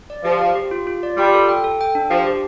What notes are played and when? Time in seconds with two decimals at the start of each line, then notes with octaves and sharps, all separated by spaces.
0.10 D5
0.25 F3 G4
0.40 G4
0.55 G4
0.71 F4
0.87 F4
1.03 D5
1.17 G3 F4
1.34 A4
1.49 G5
1.64 A4
1.81 G5
1.95 D4
2.11 F3 G4
2.27 G4